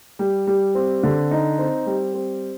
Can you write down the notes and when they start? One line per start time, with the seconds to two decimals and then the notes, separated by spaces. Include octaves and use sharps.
0.19 G3
0.47 G3
0.75 C4
1.03 D3
1.31 D#4
1.59 C4
1.86 G3
2.14 C4